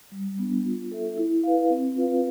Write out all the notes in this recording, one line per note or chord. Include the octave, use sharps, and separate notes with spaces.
G3
B3 D4
F4
A4 E5
E4
B4 F5
C4
F4 B4 F5